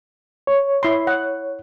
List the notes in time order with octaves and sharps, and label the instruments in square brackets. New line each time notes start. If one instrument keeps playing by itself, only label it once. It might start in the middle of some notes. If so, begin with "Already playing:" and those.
[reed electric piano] C#5
[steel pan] E4 C6
F#5